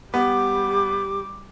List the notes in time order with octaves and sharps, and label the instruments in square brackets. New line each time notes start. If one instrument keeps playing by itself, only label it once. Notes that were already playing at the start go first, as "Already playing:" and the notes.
[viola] G3 D6 [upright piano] B3 [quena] G4